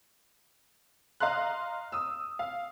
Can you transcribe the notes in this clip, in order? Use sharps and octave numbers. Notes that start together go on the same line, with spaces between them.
D#5 F5 A#5 C6 F#6
D#6 E6
F5